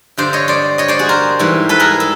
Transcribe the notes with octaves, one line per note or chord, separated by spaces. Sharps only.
G2 D3 G3 C5 D5
C#5 D#5
C5 D5
C#5 D#5
C5 D5
F#4 G#4
A#4 C5
G#2 E3 G3
A4 B4
G#4 A#4
A4